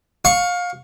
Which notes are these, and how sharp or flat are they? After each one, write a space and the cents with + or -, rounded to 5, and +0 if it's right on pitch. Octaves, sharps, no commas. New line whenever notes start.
F5 +25 C#6 +0